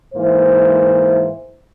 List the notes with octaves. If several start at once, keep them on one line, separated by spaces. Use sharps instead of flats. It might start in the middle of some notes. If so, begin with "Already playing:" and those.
G#2 E3 A#3 C5